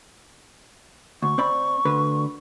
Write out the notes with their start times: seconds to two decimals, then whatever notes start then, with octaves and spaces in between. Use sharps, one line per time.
1.22 D2 C#6
1.38 C4 D5 B5
1.85 D2 D3 B4